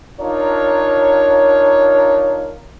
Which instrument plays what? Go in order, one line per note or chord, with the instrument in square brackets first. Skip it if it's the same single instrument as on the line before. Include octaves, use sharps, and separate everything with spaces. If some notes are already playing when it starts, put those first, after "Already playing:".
[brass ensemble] D4 D#4 F4 A#4 C#5